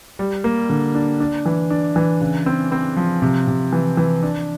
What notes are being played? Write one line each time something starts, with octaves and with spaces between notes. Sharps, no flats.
G3
A#3
D3
D4
D4
E3
D4
E3
C#3
C4
C4
F3
C3
C3
E3
E3
D4